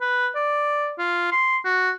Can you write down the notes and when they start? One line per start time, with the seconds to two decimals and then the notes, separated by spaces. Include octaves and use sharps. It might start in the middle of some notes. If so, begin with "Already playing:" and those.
0.01 B4
0.36 D5
0.99 F4
1.32 C6
1.65 F#4